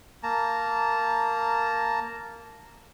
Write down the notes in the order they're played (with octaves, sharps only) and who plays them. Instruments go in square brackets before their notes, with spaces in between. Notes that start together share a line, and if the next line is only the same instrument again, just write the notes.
[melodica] A#3 A5 A#5